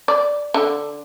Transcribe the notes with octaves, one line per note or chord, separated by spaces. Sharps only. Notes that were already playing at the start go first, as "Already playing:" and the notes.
D5
D3